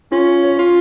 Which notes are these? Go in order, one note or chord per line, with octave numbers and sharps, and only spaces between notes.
C#4 F4
C#5
F4